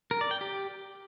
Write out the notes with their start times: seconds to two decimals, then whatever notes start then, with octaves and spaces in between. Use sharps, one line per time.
0.11 A#4
0.21 D5
0.31 G5
0.41 G4